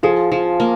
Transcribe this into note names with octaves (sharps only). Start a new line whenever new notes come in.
F3 F4 G#4
F3 F4
A#3